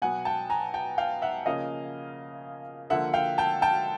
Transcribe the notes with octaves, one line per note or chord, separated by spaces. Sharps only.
B2 F#3 B3 F#5 G#5
G5 A5
G#5 A#5
G5 A5
F5 G5
E5 F#5
C#3 F3 A#3 C#4 D#5 F5
D3 F3 A#3 E5 F#5
F5 G5
G5 A5
G5 A5